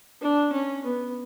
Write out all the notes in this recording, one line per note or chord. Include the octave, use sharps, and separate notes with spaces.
D4
C#4
B3